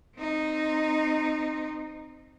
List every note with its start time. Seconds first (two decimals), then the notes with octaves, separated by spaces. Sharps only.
0.17 C4 D#4